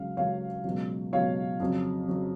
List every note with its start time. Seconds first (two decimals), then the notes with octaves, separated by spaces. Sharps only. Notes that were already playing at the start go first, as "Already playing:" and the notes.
Already playing: C#2 C#3 F#3 F5
0.17 C#2 C#3 F#3 C#5 F5
0.64 C#2 B2 F#3
1.12 C#2 B2 F#3 C#5 F5
1.60 F2 C#3 F#3
2.08 C#3 F#3